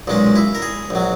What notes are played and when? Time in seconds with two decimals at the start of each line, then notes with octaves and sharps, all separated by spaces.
0.07 B1 A#2 G#3 C#4
0.36 E4
0.55 A#4
0.62 G#4
0.90 A#1 F#3